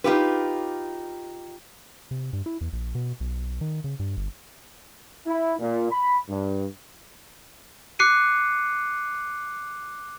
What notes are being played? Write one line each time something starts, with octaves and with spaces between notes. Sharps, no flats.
D#4 F4 G4 B4
C3
G2
E4
E2
A#1
B2
B1
D#3
C#3
G2
G1
E4
A#2
B5
G2
D6 F#6 C7 C#7 D#7